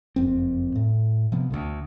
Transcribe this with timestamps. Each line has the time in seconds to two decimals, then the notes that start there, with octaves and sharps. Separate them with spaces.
0.16 F#1 F2 C4
0.75 A2
1.32 C3 F3 B3
1.50 D2 D3 D#3